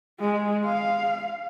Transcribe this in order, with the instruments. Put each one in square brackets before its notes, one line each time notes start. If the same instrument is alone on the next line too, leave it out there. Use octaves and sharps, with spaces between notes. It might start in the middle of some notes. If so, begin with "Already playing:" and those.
[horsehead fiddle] G#3
F5